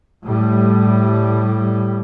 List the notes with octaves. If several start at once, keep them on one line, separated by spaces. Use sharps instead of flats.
A2 G3